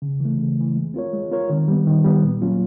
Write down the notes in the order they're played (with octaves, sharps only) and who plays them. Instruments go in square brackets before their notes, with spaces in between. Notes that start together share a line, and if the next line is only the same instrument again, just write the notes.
[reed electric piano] C#3
E3 A3
C#3
E3 A3
G#3
C4 F4 A#4 C#5
G#3
C4 F4 A#4 C#5
D#3
G3 B3
D#3
G3 B3
A#2
F#3 A#3 C#4 F4